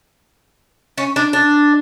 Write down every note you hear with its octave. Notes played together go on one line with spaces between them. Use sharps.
C#4
D4
D4